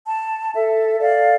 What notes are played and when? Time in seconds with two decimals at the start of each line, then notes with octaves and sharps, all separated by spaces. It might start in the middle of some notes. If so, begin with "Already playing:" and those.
0.06 A5
0.56 A4 E5
1.00 A4 D5 F5